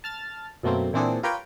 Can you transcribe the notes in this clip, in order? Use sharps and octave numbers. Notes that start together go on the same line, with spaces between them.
A5 F6 A6
F#2 B2 A3 A#3 C4
A#2 E3 C4 D4 G#4 A4
F4 G4 A#4 B4 C#5 G5